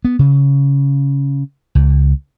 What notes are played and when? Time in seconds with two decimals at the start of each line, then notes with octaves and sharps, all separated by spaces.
0.05 B3
0.19 C#3
1.75 C#2